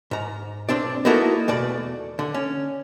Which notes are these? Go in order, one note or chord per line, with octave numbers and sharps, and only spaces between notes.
G#2 A#5
B1 C4 D4 D5
A#3 B3 D#4 E4 F#4 A4
E2 B2 A3 D5
D3
C#4